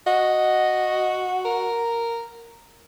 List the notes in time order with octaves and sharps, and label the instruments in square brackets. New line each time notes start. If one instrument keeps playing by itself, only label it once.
[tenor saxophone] F#4 [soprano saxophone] D#5
[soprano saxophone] A#4